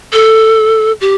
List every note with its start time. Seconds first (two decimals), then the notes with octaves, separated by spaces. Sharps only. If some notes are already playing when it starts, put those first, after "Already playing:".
0.13 A4
1.01 G4